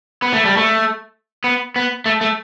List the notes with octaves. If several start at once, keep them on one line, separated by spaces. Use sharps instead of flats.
B3
A3
G3
A3
B3
B3
A3
A3